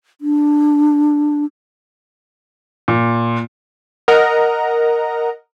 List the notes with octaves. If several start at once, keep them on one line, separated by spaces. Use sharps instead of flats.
D4
A#2
A#4 D#5 F#5 A#5